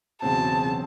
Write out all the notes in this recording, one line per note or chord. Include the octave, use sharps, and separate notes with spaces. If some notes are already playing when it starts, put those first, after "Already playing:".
E1 E2 C#3 F#3 C4 A5
C#3 F#3 C4